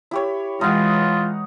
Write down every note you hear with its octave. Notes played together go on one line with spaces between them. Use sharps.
E4 G4 C#5
E3 G#3 D#4 F4 F#5